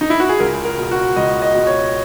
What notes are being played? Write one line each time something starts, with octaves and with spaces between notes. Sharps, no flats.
D#4
E4
F#4
G#4
C#2 A#4
A#4
B2
F#4
C#2 D#5
D#5
B2
C#5